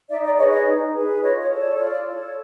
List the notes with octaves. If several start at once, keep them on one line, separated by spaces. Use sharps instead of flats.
D#4 D5 E5
D5
G#4 B4 C#5 D#5
C#5 D#5
D#4
G#4 B4
F4 C#5 D#5
C#5
A4 C#5
D5
C#5
F4 D5
A4 C#5